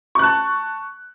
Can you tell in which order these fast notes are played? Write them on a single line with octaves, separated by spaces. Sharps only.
C#6 F#6 A5